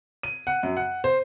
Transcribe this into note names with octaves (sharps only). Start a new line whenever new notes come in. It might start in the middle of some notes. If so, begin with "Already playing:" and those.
D#7
F#5
F#2
F#5
C5